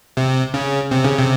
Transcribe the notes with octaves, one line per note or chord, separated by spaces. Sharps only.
C3
C#3
C3
C#3
C3